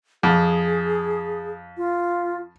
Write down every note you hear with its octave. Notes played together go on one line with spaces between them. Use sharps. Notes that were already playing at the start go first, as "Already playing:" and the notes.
F2 G#4
F4